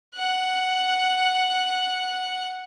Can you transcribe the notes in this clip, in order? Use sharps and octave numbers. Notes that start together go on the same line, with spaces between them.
F#5 F#6